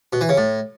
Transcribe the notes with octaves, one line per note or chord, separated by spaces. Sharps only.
B2
E3
C#3
A2